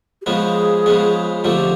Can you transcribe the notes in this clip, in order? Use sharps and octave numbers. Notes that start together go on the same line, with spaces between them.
G4
C#3 F3 G#3 B3 G#4
C#3 F3 G#3 B3
F2 D3 F3 A3 G4